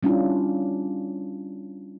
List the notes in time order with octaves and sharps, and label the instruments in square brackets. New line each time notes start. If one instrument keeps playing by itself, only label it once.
[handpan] G3 C#4 D4 E4 F4